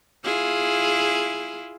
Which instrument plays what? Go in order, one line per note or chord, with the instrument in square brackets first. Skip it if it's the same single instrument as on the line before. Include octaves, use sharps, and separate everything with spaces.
[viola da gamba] E4 F4 G#4